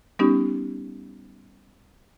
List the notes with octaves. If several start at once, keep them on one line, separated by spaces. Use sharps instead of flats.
G3 B3 C#4 D#4 G4